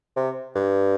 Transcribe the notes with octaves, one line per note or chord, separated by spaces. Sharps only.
C3
G2